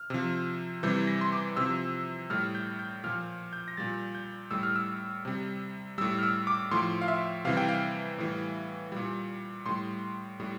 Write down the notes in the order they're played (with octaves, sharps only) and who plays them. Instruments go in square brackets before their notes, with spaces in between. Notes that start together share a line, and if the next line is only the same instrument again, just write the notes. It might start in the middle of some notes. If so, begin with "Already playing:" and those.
Already playing: [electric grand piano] F6
C3 F3
C3 E3 G3 G6
A#6
C6
D6
C3 F3 E6
A2 G3 F6
G6
G6
A#2 F3 F6
G6
A#6
A#2 G3 A6
G6
A2 G3 E6
F6
E6
C3 G3
A2 G3 E6
F6
E6
D6
A2 F3 C6
F5
E5
C3 E3 G3 F5
G5
F5
A2 E3 G3
A#2 G3
A2 G3 C6
A2 G3